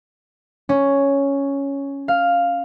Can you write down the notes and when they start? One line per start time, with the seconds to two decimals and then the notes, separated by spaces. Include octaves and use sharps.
0.69 C#4
2.08 F5